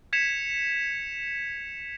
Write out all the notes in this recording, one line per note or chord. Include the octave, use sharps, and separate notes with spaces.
G#6 B6 C#7 E7 F7